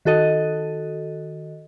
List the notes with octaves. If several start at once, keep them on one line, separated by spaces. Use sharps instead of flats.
D#3 F#4 A4 D#5